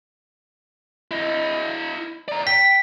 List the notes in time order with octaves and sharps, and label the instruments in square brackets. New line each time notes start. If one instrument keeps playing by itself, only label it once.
[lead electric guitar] E4 D#5
D5 A#5
[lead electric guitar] G5 [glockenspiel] B6